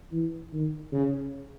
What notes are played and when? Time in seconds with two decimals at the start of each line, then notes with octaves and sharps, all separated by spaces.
0.12 E3
0.53 D#3
0.92 C#3